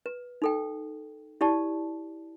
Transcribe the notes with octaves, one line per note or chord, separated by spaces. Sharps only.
B4
D#4 A4 G5
E4 G4 D5 A5